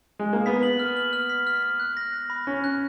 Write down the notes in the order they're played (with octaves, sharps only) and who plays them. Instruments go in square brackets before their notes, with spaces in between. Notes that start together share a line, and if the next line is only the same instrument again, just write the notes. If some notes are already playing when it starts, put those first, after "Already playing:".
[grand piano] G#3
A#3
[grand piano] B3 [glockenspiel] B6
[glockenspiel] F#7
F6
F#7
F6
B6
F6
F6
F#6
A#6
A#6
B5
[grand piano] C#4 [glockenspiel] B5
[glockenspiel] F#6